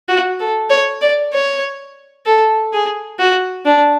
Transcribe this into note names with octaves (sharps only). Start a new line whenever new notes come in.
F#4
A4
C#5
D5
C#5
A4
G#4
F#4
D4